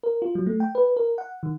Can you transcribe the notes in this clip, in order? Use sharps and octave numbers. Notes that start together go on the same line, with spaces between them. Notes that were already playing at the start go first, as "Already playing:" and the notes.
A#4
F4
F#3
A3
G5
B4
A#4
F#5
D#3